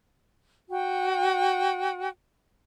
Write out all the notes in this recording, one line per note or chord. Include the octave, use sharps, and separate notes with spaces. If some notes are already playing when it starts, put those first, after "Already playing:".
F#4 G5